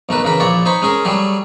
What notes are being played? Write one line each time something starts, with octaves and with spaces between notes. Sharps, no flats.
B1 A3 A#4 B4
C#3 E3 A#4 B5
A#1 A#2 E4 C#5 D5
D#4 C5 C#5 B5
G#3 C#4 G#4 A#4
F#3 G3 A3 G#4